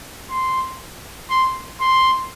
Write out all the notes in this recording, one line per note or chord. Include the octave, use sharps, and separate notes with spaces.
C6
C6
C6